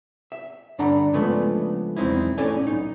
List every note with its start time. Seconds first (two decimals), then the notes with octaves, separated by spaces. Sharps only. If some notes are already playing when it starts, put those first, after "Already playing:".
0.32 E5
0.79 G2 D3 D4 F#5 A#5 B5
1.13 C#3 F3 G#3 A3 B3 D4
1.97 B1 E2 G#3 C4 D#4 E4
2.38 A2 C#4 A4 D5 G#5
2.64 B1 D#4